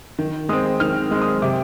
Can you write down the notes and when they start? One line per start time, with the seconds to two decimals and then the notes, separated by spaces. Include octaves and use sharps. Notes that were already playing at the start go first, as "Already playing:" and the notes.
0.19 D#3
0.49 G#3 C4 D#6
0.80 D#3 F6
1.11 G#3 C4
1.22 D#6
1.42 C3 D6